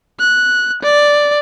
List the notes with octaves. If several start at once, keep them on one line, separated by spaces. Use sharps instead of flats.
F#6
D5